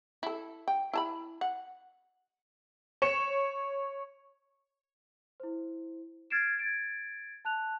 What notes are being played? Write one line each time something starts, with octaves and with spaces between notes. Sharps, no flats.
E4 A4
G5
E4 A5 B5
F#5
C#5 C#7 E7
E4 C5
F6 G#6 A6 C7 D7 E7
G#6 A6 D7
A5 F#6 F7